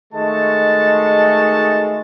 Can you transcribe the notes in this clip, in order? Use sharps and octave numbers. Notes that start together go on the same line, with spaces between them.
D#3 G#3 A3 F#4 A5